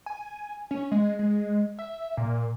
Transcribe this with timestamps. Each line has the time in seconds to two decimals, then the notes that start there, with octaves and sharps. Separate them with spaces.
0.06 G#5
0.71 C#4
0.91 G#3
1.19 G#3
1.79 E5
2.17 A#2